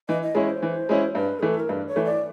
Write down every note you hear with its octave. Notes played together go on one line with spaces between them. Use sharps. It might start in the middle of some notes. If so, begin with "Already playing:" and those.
E3 D#5
D#5
G#3 C#4 E4 C#5
C5
E3
G#3 C#4 E4
G2 B4
E3 A3 G#4
A4
A#4
G2 B4
C#5
E3 A3
D5